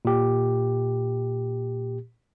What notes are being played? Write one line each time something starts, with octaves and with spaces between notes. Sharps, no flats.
A#2 G4